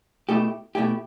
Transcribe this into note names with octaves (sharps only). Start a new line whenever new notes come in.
B2 A3 E4 G4
B2 A3 E4 G4